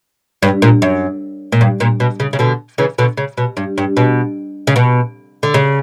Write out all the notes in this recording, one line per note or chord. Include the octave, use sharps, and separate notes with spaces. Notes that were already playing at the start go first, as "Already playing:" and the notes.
G2
A#2
F#2
A#2
G2
A#2
B2
C#3
C#3
B2 D3
C#3 E3
B2 D3
C#3
B2
G2
G2
B2
C#3
B2
D3
C#3